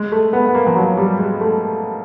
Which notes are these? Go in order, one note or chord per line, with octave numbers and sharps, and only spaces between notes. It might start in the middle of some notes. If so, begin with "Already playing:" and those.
Already playing: G#3
A3
B3
B3
A#3
F3
F#3
G3
G#3
A3